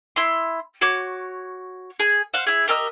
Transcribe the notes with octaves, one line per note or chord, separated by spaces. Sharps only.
E4 C6
F#4 C#5 D6
G#4
C5 F5 F#5
E4 G#4
G4 A#4 D#5 E6